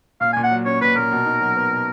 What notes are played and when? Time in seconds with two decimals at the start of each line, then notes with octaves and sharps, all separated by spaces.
0.21 A#2 F5
0.33 A#2 G#5
0.44 F#5
0.51 F#3
0.66 C#4 C#5
0.82 A#2 B4
0.96 A#2 A#4
1.12 B2
1.26 D#4
1.41 F#3
1.56 B3
1.72 B2